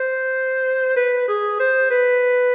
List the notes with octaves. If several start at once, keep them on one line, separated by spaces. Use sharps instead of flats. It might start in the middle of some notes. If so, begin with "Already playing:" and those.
Already playing: C5
B4
G#4
C5
B4